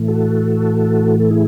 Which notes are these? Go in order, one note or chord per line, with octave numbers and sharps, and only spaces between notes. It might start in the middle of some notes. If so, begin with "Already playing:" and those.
Already playing: A2 E3 A3
F#4 A4
A4
E4 G#4